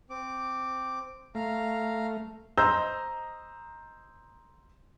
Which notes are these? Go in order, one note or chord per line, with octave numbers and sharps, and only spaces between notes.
C4 D6
A3 F5 A#5
C5 D#5 A#5 E6 G6